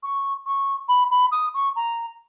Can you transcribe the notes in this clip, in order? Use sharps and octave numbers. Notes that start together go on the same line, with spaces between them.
C#6
C#6
B5
B5
D#6
C#6
A#5